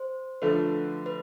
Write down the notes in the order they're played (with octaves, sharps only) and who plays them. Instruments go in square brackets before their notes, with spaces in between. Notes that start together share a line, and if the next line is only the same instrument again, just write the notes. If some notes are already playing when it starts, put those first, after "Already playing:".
Already playing: [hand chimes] C5
[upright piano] D3 F3 A3 [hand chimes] B4
[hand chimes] B4